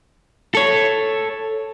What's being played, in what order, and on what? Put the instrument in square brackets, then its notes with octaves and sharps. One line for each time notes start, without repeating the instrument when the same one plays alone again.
[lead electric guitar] A4 C#5